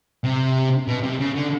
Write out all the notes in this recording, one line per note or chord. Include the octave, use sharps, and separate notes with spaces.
C3
B2
C3
C#3
D3